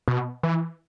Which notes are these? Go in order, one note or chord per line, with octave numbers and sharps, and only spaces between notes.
B2
E3